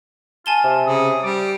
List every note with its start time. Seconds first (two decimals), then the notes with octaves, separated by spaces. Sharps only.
0.46 F4 G#5 A5 G7
0.64 C3
0.86 C#3 D#6
1.23 G3 D6